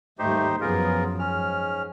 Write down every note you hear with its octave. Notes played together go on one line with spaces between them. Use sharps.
D#2 G#2 G3 A3 D#4 G4 C5
F#2 F3 B3 F4 G#4 A#4
G#2 C#4 F6